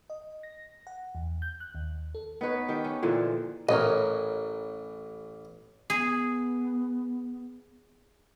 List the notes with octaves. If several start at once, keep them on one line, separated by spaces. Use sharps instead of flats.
D#5
A#6
F#5
E2
G6
F#6
D#2
A4
B3 D#4 B4 C#5
D#3 G4
C#4
A#2 D3 E3 F3
A1 A#4 C#5 D#5
B3 G#4